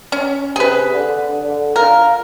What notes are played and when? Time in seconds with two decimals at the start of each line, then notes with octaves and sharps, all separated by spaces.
0.12 C#4
0.56 C3 G#4 B4
0.92 D3
1.40 D3
1.76 F4 A#4